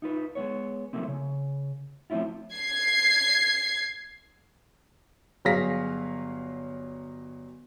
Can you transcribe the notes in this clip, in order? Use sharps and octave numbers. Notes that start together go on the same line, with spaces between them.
D#4 F4 B4
G#3 B3 C#5
F3 G3 A3 A#3 C4
C#3
F3 A3 C4 C#4 E4 F4
G#6 C7
G1 F#3 G#4 F5 A#6 B6